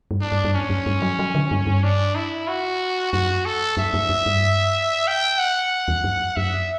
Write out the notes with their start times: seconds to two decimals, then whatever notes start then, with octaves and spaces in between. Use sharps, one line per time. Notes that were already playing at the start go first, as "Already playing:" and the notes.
0.11 G2
0.21 D4
0.32 G2
0.44 G2
0.54 F#2 C#4
0.70 F#2
0.86 G2
1.02 F#3
1.19 F#3
1.35 D3
1.51 G2
1.67 G2
1.83 D4
2.15 E4
2.48 F#4
3.13 F#2 F#4
3.45 A4
3.77 F#2 E5
3.94 F#2
4.09 F#2
4.26 G2
5.08 G5
5.39 F#5
5.88 E2
6.04 F#2
6.36 F#2 E5